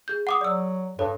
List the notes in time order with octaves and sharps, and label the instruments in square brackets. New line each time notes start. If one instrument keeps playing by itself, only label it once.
[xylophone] G#4 G6
F#5 D6 D#6
[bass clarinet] F#3 [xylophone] D5 E6
[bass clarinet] G2 [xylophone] A4 C#5